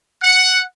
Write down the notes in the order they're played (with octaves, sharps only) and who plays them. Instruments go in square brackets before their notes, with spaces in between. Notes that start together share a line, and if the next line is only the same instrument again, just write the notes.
[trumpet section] F#5